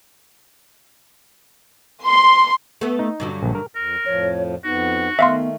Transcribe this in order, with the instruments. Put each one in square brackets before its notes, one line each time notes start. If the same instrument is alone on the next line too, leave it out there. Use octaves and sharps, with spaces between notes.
[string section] C6
[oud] A3 B3
[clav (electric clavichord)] D#4
[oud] G2 D3 F#3
[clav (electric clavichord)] A#1
A#4
[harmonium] F2 [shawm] A#4
[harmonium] F2 A2 F3 [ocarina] C#5
[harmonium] F2 B3 [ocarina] D#4 [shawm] F#4
[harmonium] D#3 A3 [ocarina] B3 [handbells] E5 F5 C6